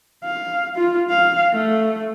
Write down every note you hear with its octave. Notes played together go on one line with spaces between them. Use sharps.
F5
F4
F5
A3